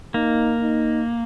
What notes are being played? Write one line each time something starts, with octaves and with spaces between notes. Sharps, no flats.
A#3 D#4
D#4